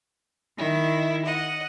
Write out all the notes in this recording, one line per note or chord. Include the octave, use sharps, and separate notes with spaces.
D#3 E4
D#5 F#5